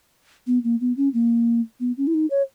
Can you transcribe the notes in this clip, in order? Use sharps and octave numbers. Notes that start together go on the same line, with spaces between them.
B3
A#3
B3
C#4
A#3
B3
C#4
E4
D#4
C#5